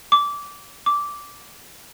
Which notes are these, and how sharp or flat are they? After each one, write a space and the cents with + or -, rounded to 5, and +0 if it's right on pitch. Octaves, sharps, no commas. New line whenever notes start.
D6 -20
D6 -10